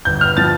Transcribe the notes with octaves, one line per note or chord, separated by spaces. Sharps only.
G1 G6
F6
F3 A6